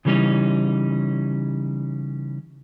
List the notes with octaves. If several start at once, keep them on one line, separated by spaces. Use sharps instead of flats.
C#3 E3 G3 C4 C#4 D#4